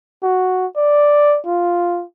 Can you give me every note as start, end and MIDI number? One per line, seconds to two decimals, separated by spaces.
0.23 0.66 66
0.76 1.38 74
1.46 2.04 65